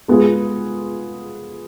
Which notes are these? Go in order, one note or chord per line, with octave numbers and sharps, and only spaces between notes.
G#3 B3 F4 G#4